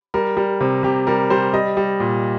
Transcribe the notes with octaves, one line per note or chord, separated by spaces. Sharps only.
G3 A#4
G3
C3
C3 G4
G3 A#4
G3 C5
G3 D#5
G3
A#2